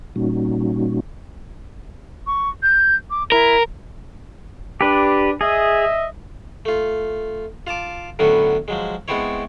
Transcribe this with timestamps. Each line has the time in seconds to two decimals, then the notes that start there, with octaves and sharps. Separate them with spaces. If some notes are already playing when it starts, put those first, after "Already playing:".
0.16 A#2 G3 A#3 C#4 D#4 F#4
2.27 C#6
2.63 G6
3.10 D6
3.32 E4 A#4
4.81 D4 G4 B4
5.41 G#4 D#5 E5
6.65 A3 F4
7.67 F4 F5 A5 D6
8.19 A2 D3 F#3 B3 C#4
8.68 F3 F#3 G#3
9.08 G#3 B3 C4 E4 C#5